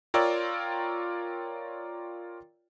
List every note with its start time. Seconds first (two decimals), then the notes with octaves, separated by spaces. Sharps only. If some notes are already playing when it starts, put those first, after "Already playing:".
0.14 F4 A#4 C#5 D5 G5 E6